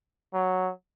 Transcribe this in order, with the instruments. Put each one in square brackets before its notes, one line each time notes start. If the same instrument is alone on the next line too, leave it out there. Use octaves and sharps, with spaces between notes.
[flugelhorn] F#3